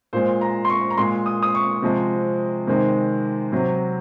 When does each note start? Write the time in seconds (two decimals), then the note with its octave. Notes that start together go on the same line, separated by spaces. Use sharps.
0.13 A#2 G#3 C5
0.41 A#5
0.65 C6
0.70 C#6
0.90 A#5
0.97 A#2 G#3 C6
1.26 D#6
1.42 D#6
1.55 C#6
1.82 C3 F3 G#3
2.67 C3 D#3 G#3
3.52 C3 F#3